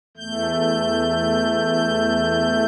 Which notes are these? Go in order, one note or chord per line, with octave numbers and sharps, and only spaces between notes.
E2 A3 G6